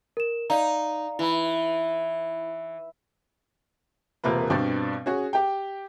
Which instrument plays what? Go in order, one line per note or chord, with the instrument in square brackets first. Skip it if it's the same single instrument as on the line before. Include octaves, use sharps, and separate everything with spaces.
[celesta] A#4 E7
[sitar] D#4 [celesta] D5 F5 A#5
[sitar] E3 [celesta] E4 B5
[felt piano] E1 C3 A#3 F4 B4
G2 B2 C4 D4 D5
C#4 F#4 G#4
G4 G5